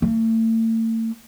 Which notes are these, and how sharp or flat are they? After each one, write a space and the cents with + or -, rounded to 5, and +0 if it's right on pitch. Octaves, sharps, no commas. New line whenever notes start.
A3 +40